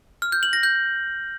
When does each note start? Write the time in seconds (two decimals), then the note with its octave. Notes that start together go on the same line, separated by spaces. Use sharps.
0.22 F6
0.32 G6
0.43 F#7
0.53 A#6
0.63 G6